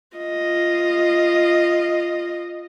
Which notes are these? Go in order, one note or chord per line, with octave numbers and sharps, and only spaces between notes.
F4 D#5